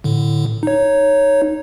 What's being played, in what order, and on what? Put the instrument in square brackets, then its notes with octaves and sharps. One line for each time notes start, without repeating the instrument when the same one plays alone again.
[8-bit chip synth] A2 D3
D#4 C#5